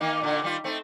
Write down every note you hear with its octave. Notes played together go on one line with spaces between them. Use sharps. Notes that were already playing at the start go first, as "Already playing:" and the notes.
D#3 A#3 D#4
A#2 D3 A#3
D#3 G3 F4
A3 C4 D#4